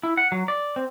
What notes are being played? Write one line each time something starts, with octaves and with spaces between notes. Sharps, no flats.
E4
F#5
F#3
D5
C4